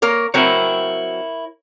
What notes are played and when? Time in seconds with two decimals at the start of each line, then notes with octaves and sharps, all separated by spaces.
0.02 A#3 A#4 C#5
0.34 F#3 C4 E4 A#4 C#5